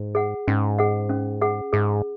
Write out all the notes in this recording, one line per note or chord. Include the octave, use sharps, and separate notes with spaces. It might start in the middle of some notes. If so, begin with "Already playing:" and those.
Already playing: G#2
G#4 F#5
G#2 C#4
G#4 F#5
C#4
G#4 F#5
G#2 G#4